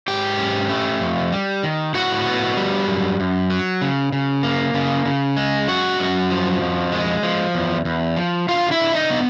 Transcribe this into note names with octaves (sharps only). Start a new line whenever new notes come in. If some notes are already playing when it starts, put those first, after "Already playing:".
G#2 G4 G5
C#4
A3
F2
G3
D#3
A2 F#4 F#5
B3
G3
F#2
F#2
F#3
C#3
C#3
A#3
C#3
C#3
G#3
F#2 F#4 F#5
F#2
F3
F2
G#3
F3
E2
E2
F3
D3 F4 F5
E4 E5
D3
D#4 D#5
B3